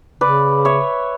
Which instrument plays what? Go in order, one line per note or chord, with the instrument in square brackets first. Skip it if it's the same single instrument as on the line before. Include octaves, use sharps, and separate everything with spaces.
[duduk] C#3 [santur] B4 D5
[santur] C#5 E5